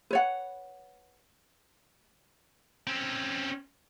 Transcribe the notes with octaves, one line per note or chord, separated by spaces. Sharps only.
B4 C#5 F#5
C4 C#4